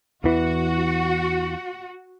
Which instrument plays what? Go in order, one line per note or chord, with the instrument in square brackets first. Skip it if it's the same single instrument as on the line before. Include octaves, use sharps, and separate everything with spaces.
[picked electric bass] E2 E3 [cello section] F#4